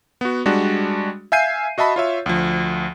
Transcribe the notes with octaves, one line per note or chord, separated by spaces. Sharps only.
B3 F#4
G3 G#3 D4 F#4
E5 F5 G#5 G6 C7 D#7
F#4 D#5 E5 A5 B5
F4 C#5 E5
D2 F3